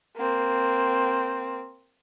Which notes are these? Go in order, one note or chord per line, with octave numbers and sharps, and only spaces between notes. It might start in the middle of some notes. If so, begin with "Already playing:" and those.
A#3 C4